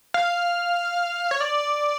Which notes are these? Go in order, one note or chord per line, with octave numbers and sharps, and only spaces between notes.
F5
C#5
D5